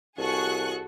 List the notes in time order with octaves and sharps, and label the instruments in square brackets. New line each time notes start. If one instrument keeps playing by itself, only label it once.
[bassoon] C2 [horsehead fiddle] F#4 A4 [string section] G#4 C#6 F#6